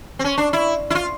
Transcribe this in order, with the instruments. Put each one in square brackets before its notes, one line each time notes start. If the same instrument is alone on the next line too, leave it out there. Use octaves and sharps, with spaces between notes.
[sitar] C4
C#4
D4
E4
E4
F4